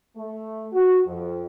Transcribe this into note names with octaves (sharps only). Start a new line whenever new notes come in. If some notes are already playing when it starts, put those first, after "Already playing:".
A3
F#4
F2